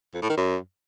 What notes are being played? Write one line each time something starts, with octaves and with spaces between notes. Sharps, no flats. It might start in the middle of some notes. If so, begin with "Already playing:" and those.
F2
A2
D#3
F#2